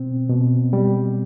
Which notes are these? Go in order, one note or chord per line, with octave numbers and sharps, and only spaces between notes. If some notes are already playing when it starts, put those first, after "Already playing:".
Already playing: B2 C4
B2
G3